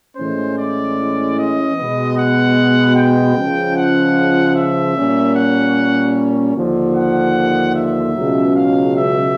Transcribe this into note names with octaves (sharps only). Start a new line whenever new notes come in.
A2 E3 G#3 C#4 C5
D5
D#5
B2 G#3 B3
F#5
G5
C#2 C#3 F3
F#5
E5
A#2 G3 A#3 C#4
F#5
D#2 D3 F3
F#5
E5
C#2 B2 F#3
F5
E5